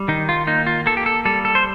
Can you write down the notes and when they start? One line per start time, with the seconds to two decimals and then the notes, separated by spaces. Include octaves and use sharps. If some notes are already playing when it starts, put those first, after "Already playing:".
Already playing: G3
0.08 D#3 D#4
0.29 F4
0.47 A#3 D#4
0.67 F4
0.86 A#3 A4
0.97 G4
1.06 A4
1.25 G3 A4
1.45 A4
1.55 C5